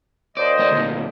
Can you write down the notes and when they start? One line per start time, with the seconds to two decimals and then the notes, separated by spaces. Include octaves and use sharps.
0.37 D#2 C5 D5 D#5
0.59 A3 D5
0.72 D2 A#2